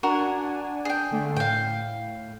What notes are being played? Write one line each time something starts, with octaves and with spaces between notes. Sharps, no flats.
D4 F#4 A#4 F#5 G#5
D4 G#4 G5
D3 A3
A2 F5 G5